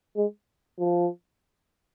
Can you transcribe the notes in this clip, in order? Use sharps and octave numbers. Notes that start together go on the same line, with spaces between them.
G#3
F3